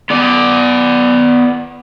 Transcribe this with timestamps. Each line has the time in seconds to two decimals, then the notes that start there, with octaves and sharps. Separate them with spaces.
0.10 B3 D5